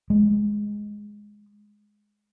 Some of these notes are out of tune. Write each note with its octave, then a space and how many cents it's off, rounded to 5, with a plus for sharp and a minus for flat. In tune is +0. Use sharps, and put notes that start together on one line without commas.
G#3 +0